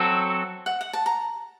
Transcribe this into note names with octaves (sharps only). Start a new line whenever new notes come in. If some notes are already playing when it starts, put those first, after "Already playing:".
Already playing: F#3 C4 F#4 A4
F#5
F#5
A5
A#5